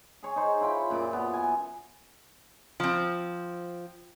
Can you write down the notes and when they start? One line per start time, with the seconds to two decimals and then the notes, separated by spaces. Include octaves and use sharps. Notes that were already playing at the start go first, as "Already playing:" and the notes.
0.23 G#4 C#5
0.36 D#4 C5 C#5
0.61 E4 F4 G5 B5
0.90 F#2 A#2 D6
1.13 B3
1.33 G#5
2.80 F3 C4